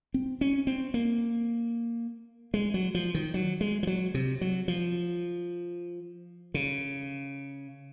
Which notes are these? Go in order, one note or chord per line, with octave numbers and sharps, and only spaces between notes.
C4
C#4
C4
A#3
G#3
F#3
F3
D#3
F#3
G#3
F3
F#3
C3
F#3
F3
C#3